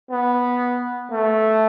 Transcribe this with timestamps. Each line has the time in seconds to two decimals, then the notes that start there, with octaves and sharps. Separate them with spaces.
0.11 B3
1.12 A3